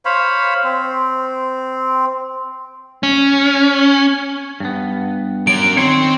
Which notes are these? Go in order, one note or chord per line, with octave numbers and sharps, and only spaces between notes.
C5 C#5 F5 B5
C4
C#4
G2 B3
F#3 C#4 D7
D#3 C4 C5 C#5